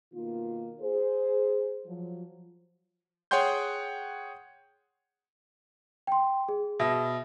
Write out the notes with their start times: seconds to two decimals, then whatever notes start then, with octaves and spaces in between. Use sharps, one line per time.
0.13 B2 D#3 A#3 F4
0.81 G#4 C5
1.87 F3 F#3
3.31 G#4 C#5 F#5 G5 C6 G6
6.07 G5 C6
6.49 G#4
6.80 B2 E5 A#6